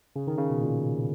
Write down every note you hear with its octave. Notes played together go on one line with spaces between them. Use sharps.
C#3
D#3
C#3
B2
A#2